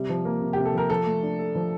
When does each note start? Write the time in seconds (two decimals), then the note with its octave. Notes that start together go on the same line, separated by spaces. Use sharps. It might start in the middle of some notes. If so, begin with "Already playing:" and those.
Already playing: C3 G3
0.09 F3
0.25 A#3
0.41 C3
0.53 G4
0.58 C3
0.65 A4
0.73 F3 A#4
0.90 F3 A4
1.06 A3
1.23 D4
1.39 A4
1.55 F3